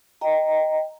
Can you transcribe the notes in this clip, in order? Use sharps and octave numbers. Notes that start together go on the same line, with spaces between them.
D#5 G5 A#5